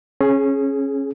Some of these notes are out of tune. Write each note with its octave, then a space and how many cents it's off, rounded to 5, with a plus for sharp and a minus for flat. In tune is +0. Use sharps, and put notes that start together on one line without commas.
C#4 -20 G#4 +15